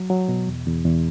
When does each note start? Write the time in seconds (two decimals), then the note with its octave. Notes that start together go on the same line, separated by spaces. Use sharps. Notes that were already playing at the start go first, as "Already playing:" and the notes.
Already playing: F#3
0.10 F#3
0.28 B2
0.48 E2
0.67 E2
0.85 E2